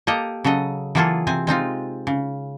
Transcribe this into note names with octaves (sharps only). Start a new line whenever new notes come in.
A#3 G4 A4 D#5 A#5
C#3 F#3 A4 D#5
E3 F#3 A#3 F4 G#4 A4
C3 C4 G#5
G#3 C4 D#4 F4
C#3